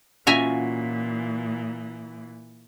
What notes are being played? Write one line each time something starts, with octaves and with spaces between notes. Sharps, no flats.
A#2 E3 C#4 F4 F#4 E5 G#5 A#5